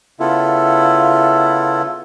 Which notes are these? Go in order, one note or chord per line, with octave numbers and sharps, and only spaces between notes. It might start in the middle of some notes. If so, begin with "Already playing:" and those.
C#3 B3 E4 F4 A4